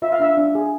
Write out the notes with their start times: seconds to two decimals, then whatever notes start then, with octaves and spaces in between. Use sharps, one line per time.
0.02 F4 E5
0.12 F5
0.19 D4 E5
0.37 D4
0.55 G#4